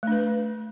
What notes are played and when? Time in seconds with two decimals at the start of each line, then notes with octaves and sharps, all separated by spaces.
0.03 A3
0.07 D4
0.12 B4